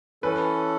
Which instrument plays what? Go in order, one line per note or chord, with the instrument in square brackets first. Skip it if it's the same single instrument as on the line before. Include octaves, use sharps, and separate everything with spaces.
[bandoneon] E3 C#4 A4 [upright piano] B4